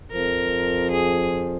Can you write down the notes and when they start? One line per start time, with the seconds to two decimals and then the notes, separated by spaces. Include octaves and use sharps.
0.12 F2 F3 A#4
0.92 G#4